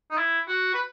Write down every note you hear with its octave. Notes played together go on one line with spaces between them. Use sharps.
D#4
E4
F#4
B4